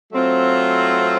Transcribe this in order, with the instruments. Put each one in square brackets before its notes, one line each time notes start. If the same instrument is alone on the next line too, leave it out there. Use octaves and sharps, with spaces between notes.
[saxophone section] F#3 A3 C4 F4